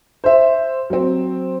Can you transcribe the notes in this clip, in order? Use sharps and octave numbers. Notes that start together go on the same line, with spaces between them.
C5 E5
F#3 C4